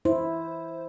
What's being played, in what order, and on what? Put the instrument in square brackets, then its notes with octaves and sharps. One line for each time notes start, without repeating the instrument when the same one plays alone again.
[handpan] E4 [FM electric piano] C5